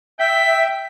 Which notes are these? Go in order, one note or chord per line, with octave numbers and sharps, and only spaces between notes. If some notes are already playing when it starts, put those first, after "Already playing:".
E5 G5 B6